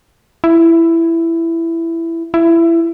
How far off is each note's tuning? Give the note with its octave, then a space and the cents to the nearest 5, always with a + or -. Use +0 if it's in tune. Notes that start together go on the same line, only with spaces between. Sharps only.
E4 +10
E4 +20